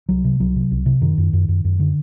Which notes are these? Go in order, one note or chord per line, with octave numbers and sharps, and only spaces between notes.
C2 F#3
C3
C2 F#3
C3
C2
C3
F#2 D#3
F#2
F#2
F#2
F#2
D3